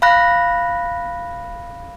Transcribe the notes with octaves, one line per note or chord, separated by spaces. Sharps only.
F5 B5 F#6 A#6